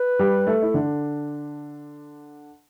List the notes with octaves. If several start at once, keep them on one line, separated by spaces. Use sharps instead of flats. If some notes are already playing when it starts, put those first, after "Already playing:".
Already playing: B4
G3 G4
A3 A4
E4
D3 D4